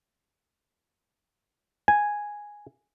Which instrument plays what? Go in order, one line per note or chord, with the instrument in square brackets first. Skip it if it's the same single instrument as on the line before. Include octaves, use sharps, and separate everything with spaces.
[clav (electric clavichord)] G#5